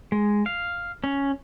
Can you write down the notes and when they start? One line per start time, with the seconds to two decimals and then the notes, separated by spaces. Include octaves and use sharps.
0.12 G#3
0.46 F5
1.04 C#4